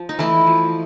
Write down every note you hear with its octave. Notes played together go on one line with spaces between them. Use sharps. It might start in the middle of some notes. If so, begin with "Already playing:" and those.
Already playing: F3
D#4
E3 A3 E4
F3